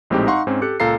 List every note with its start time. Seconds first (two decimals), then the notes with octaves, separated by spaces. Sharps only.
0.10 A#1 A2 G#3 C4 D#4 G4
0.27 D#4 F5 F#5 C6 C#6
0.47 G#2 C4 C#4
0.62 G4 A4 F#6 C#7
0.80 C#2 A#2 A4 F5 A#5 C7